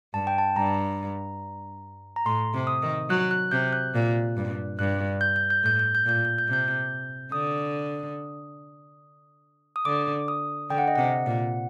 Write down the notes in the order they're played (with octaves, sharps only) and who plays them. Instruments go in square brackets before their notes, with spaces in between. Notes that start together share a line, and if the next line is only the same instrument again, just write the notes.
[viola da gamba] G2 [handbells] A5
[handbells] G5
A5
[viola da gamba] G2 [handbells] A#5
[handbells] A#5
[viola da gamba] A2 [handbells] C6
[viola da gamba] C3
[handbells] D#6
[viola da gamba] D#3
[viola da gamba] F#3 [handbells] F#6
[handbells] F#6
[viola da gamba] C3 [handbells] G6
[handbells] F#6
[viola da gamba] A#2
G2
[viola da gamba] G2 [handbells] F#6
[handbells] G6
G6
G6
[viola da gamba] A2 [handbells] G6
[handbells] G6
G6
[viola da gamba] A#2 [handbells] G6
[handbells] G6
G6
[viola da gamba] C3
[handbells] G6
G6
[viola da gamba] D3 [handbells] D#6
[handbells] D#6
[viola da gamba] D3 [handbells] D6
[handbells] D#6
[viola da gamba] D3 [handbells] G5
[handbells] F#5
D#5
[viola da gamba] C3 [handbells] F#5
[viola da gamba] A#2